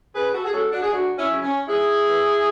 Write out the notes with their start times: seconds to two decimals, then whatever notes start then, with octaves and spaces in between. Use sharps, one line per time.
0.15 C#3 G#4 B4
0.33 F#4 A4
0.45 G#4
0.53 G#3 C#4 F#4 A4
0.72 D4 F#4
0.83 G#4
0.91 D2 D4 F#4
1.17 C#4 E4
1.29 C#3 F#3 C#4
1.43 C#4
1.67 G#2 E4 G#4
2.06 E3 A3